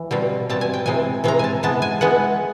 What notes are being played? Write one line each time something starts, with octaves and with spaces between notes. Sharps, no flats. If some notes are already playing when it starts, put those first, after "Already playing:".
Already playing: E3
B2 G3 C4
B2 G3 C4 A5
G#5
G5
C3 E3 G#3 C4 G#5
C3 E3 G#3 C4 A#5
G#5 A5
E3 G#3 B3 A5
G#5
E3 G#3 B3 F#5